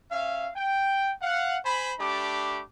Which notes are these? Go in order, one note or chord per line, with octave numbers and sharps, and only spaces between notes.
C#4 E5 F5
G5
F5 F#5
C5 G#5 B5
A3 D4 G4 B5 D6